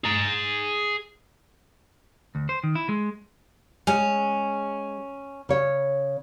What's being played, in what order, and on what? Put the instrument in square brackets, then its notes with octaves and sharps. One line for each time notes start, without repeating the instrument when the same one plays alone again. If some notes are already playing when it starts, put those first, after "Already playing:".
[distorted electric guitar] G#4 A#5
[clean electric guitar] D2
C5
D#3
E4
G#3
[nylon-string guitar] G#3 [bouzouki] C#4
[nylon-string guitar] C#3 C#5